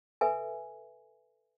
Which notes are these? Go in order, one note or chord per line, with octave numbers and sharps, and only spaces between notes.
A4 B4 E5 G#5